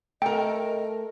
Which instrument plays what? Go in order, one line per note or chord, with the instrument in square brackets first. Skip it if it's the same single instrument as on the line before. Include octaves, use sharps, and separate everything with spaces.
[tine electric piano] A3 [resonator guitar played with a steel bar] A4 A#4 [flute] D#5 [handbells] G5